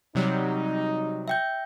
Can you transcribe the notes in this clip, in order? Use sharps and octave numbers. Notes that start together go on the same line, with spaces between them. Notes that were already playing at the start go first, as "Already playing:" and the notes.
C3 F#3 G3 D#4
E5 G5 G6